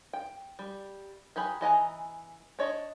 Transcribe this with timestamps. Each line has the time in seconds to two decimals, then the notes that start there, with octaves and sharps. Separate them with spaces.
0.13 G5
0.59 G3
1.36 F#3 G4 G#4 B5
1.61 E3 D#5 G#5 A#5
2.59 D4 C#5 D#5